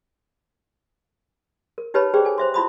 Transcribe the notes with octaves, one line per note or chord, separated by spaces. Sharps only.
A#4
D#4 G4 B4 C#5 A5 B5
G4 G#4 B4 C5 D5 G5
A4 G#5
C5 E5 C6
E4 F4 E5 B5 C6 D#6